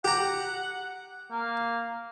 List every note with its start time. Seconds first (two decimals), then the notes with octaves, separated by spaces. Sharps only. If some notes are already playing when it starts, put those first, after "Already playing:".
0.05 G4 F#5 A#5
1.31 A#3